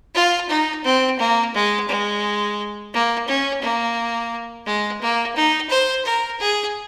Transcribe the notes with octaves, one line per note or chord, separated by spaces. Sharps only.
F4
D#4
C4
A#3
G#3
G#3
A#3
C#4
A#3
G#3
A#3
D#4
C5
A#4
G#4